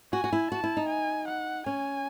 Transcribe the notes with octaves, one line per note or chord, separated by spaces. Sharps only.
F#4 G#5
F#4
E4
F#4 A5
E4
D#4
G#5
F#5
C#4 G#5